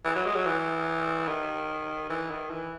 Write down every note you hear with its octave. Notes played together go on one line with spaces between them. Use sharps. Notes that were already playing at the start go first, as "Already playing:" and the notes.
E3
F#3
G#3
F#3
E3
D#3
E3
D#3
E3